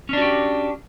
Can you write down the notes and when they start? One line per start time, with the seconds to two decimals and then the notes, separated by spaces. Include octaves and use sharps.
0.09 C#4
0.13 D4
0.17 F#4
0.22 G4